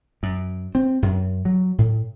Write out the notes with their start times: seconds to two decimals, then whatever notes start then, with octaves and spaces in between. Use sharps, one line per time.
0.23 F#2
0.75 C4
1.02 F#2
1.45 F#3
1.78 A2